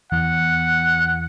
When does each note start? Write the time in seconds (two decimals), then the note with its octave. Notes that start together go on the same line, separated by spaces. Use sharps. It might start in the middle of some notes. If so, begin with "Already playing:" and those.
0.12 E2 F#5